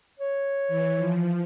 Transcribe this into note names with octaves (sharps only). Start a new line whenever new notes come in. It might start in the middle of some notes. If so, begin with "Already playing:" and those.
C#5
E3
F3